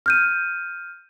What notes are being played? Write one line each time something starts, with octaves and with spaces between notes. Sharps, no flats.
F6 G6 D#7